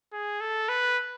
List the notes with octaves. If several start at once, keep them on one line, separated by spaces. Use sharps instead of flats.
G#4
A4
B4